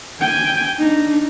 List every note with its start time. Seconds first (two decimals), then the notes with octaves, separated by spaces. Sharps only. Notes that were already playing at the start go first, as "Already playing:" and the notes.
0.21 G5 G#5
0.79 D4 D#4